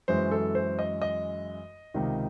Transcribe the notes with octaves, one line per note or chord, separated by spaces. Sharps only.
F#2 E3 G#3 C5
A4
C5
D#5
D#5
C#2 C3 D#3